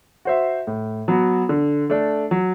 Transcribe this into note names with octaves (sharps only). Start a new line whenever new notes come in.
F#4 C5 E5
A2
F#3 B3 F#4
D3
A3 D4 A4
F#3